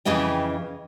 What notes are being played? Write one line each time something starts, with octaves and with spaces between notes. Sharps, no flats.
F2 C#3 E3 D#5 G5